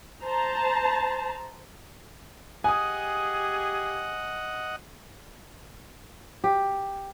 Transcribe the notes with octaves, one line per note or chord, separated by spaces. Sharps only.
C5 A5 A#5
G4 G#4 D#5 F#5 G#5 D#6
G4